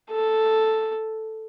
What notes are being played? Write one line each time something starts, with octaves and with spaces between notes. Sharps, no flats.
A4